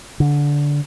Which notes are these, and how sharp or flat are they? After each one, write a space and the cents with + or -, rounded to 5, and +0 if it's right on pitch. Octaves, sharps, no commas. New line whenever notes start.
D3 -15